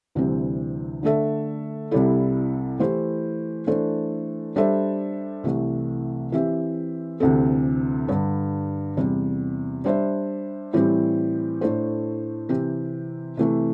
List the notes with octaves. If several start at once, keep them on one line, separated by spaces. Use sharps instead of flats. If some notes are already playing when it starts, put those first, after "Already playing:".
D2 C3 E3 G3 C4
D3 A3 D4 A4 E5
C2 C3 G3 E4 A4
E3 A3 E4 G4 C5
E3 A3 D4 A4 C5
G3 D4 A4 C5 E5
C2 C3 E3 A3
E3 C4 G4 E5
D2 C3 E3 C4 A4
G2 D3 G3
E2 C3 G3
G3 D4 C5 E5
A2 E3 G3 C4 G4
A2 A3 D4 A4 C5
C3 E3 C4 G4
C3 E3 A3